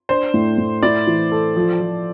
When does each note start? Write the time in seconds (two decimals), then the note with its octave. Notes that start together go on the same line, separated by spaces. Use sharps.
0.09 D4 C5
0.34 A2
0.58 A2
0.83 E4 D5
1.07 E3
1.32 A4
1.56 F3
1.81 F3